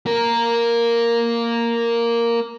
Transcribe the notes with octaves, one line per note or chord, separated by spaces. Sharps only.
A#3 A#4